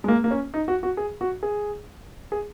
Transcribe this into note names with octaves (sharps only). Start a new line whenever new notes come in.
G#3
A#3
A#3
C#4
D#4
F#4
F#4
G#4
F#4
G#4
G#4